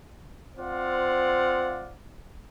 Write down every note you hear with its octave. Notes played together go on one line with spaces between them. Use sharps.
C4 F4 C5 D5 F5 F#5